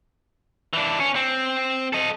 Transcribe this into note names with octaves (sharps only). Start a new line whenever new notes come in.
E3 D4
C#4
C4
A4 D#5